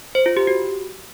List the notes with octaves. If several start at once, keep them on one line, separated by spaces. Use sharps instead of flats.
C5
F4
G4
F#4